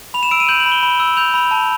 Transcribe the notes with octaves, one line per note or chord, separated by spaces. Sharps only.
B5 F7
E7
E6 D7
D#7
G6 F#7
F#7
B5
G7
B5
E6
G6 F7
B5
A5